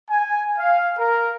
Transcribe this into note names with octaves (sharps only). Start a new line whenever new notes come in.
G#5
F5
A#4